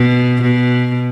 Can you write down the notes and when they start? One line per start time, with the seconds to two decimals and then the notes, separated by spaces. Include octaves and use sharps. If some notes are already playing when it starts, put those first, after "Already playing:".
Already playing: B2
0.41 B2